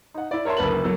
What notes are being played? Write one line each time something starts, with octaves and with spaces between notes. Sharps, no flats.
D#4 F#5
E4 D5
A#4 C#5 E5 A5 C6
F#1 D2 A#3 B4 A5 F#7
F#3 A#3 A4